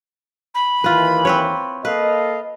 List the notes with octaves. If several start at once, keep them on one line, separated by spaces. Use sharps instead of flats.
B5
D#2 D#3 E3 F4 B4
C4 B4 C#5
A#3 A4 B4 D#5 F5